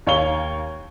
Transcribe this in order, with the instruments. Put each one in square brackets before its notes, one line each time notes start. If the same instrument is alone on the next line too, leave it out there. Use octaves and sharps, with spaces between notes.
[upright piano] D#2 C#5 F5 G7